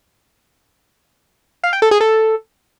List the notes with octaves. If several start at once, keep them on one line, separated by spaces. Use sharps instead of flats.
F5
G5
A4
G#4
A4